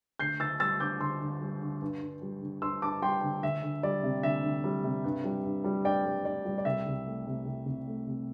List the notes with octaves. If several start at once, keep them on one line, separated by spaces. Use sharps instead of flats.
D2 G6 C7
D2 E6 A6
G3 E6 A6
D3 D6 G6
D2 C6 E6
D2
G3
D3
G2
G2
G3
D3
G2 C6 E6
G2 A5 D6
G3 G5 C6
D3
D2 E5
D2
G3 D5
C3
D2 E5
D2
G3
C3
G2
G3
G2
G3
G2 D5 G5
G3
G2 D5
G3
D5
C2 E5
C2
A3
C3
C2
C2
A3
C3